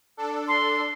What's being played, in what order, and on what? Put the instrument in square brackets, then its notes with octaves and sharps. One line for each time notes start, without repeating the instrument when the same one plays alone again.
[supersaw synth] D4 A4
[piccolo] C6